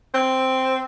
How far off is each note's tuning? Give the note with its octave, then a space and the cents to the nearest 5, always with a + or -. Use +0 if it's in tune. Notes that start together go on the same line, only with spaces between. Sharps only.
C4 +0